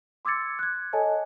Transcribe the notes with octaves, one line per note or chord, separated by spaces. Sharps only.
C6 D6 E6 G#6 A6 C#7
F#6 G#6
A4 C#5 D#5 G#5 A5